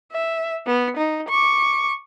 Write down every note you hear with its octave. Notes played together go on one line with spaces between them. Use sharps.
E5
B3
D#4
C#6 D6